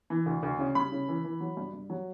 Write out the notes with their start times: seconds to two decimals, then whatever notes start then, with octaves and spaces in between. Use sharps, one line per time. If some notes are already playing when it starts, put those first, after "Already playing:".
0.10 E3
0.26 D2
0.43 D2
0.59 C#3
0.75 G3 B5
0.92 C#3
1.08 E3
1.24 E3
1.40 F#3
1.57 G2
1.73 G2
1.90 F#3